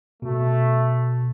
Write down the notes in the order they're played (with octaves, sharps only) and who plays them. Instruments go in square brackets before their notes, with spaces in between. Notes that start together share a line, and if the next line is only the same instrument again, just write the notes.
[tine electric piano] B2 [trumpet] A3